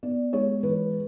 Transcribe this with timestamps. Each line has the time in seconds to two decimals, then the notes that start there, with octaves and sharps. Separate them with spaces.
0.03 B3 D5
0.33 G#3 C#5
0.63 E3 B4